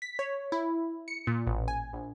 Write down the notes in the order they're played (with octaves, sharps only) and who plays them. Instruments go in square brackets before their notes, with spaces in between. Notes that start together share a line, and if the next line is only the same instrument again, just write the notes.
[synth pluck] B6
C#5
E4
C#7
A#2
A1
G#5
A#1